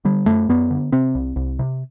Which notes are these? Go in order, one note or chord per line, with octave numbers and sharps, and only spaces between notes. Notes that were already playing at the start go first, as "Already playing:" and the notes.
D3 G3
F#2 A3
F#2 B3
D3
C3 C4
C2
C2
C3